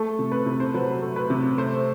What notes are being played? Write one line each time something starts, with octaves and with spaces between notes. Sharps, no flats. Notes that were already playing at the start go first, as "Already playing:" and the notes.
Already playing: A3 A4
C3
B4
C3
C5
F#3 B4
A3
B4
C3
A3 C5